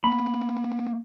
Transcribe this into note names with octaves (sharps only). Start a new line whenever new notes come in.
A#3 B3 B5